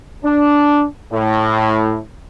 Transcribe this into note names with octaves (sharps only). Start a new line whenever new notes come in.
D4
A2